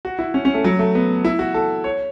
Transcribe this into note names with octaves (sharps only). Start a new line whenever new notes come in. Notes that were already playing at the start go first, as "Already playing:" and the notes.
F#4
E4
C#4
C#4
A3
F#3
A3
B3
E4
F#4
A4
C#5